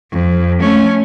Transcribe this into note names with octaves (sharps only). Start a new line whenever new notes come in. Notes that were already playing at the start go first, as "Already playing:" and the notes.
F2
A3 C#4